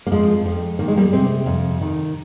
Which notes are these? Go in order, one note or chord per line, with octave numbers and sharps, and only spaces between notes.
A#3
F2 F3 G#3
F2
D#3 A#3
G#3
G3 A#3
C3 G#3 C4
F2
D#3